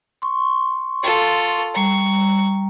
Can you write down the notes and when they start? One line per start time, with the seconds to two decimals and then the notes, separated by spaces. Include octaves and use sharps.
0.22 C6 C#6
1.03 F4 A4
1.74 G3 A#5 C#6